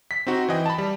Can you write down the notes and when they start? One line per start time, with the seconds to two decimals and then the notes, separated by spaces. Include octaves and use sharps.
0.11 B6
0.27 C4 D#4 F#4
0.48 E3 D#5 G5
0.66 A5 B5
0.78 G3